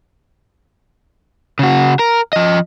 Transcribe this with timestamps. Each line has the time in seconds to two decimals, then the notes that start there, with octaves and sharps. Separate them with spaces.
1.59 C#3 F#4
1.99 A#4
2.33 F3 D#5